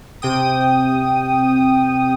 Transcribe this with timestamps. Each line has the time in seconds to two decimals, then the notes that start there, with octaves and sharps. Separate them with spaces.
0.22 C3 G5 D#6